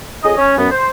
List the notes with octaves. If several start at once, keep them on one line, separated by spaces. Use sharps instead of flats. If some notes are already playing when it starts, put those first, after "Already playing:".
F2 G#4 C#5 D#5
C#4
F#2 B3
C5